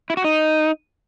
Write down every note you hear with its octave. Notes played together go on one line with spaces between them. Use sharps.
E4
F#4
D#4